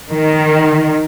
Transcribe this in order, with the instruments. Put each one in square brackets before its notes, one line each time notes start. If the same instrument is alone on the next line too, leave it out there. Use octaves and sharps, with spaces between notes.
[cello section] D#3